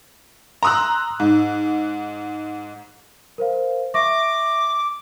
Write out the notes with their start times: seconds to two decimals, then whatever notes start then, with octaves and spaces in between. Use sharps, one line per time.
0.63 A#5 C6 D#6 E6 F#6
1.20 G#2
3.38 A#4 C5 F5
3.94 E5 C#6 D6 A#6